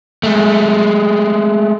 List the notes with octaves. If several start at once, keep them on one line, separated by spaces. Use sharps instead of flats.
G#3 A3